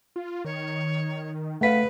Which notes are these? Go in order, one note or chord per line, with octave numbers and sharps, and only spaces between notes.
F4
D#3 C#5
C#3 A3 B4 F5 F#5 B6